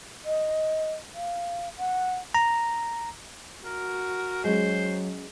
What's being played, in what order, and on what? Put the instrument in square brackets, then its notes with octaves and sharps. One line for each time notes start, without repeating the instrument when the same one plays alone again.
[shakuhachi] D#5
F5
F#5
[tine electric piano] A#5
[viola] F#4 [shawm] A#4
[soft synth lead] F#3 [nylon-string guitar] G#3 C#4 [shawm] C5